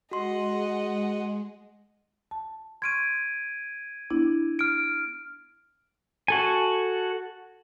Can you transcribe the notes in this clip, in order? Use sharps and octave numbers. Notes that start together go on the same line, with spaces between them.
G#3 F#4 D#5 F#5 C6
A5
C6 C#6 F6 G#6 D7 D#7
B3 D4 E4
F6 D7
F#4 A4 G#5